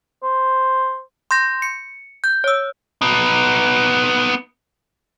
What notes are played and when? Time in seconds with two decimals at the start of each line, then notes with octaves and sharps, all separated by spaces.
0.23 C5
1.31 C6 G6 A#6
1.62 C#7
2.24 G6
2.44 C#5 E6
3.02 B3 D#4